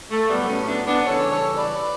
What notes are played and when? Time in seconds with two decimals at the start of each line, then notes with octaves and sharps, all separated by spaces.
0.11 A3
0.29 A2 F#3 G3 B3
0.48 A3 C#4
0.68 B3 D4
0.87 B3 D4
1.06 C#3 E3 G3 A4 C#5
1.31 A4 C#5
1.57 B4 D5